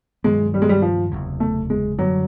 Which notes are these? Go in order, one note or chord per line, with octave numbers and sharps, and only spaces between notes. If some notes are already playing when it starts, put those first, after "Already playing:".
G2 D#3 F#3 G#3 B3
G3
G#3
G3
F3
F#1 E2 C3
A3
G#3
F#2 D3 F#3 G3